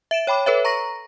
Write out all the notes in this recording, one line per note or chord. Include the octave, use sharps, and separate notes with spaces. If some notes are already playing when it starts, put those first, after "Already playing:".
E5 D7 E7
C#5 G5 B5 D6
A4 B4 C#5 E5
A#5 C#6 A#6